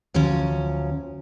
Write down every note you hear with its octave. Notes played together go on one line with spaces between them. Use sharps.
D2 F3 F#3 C#4